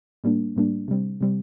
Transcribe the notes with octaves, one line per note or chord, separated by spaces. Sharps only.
A2 G3 A#3 D4
A2 G3 A#3 D4
C3 G3 C4
C3 G3 C4